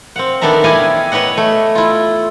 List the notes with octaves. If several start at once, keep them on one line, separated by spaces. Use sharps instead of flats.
C4 F5 F#5
D#3 B3 D4 A4 E5 A#5
E4 G4 D5 D#5 F5 G#5
B3 B4 C#5 D#5 F#5
A3
E4 F4